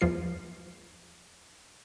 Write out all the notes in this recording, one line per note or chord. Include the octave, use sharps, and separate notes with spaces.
E2 F3 F4 C7